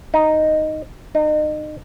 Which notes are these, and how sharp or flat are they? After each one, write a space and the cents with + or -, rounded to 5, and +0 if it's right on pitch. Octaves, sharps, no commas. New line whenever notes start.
D#4 +0
D#4 -30